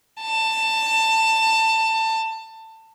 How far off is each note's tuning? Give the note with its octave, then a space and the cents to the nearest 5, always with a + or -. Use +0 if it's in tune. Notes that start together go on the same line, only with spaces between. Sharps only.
A5 +20